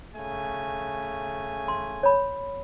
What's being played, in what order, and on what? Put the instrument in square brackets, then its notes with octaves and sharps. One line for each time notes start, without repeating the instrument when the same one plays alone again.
[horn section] C#3 A3 G#5
[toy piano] C6
C#5 B5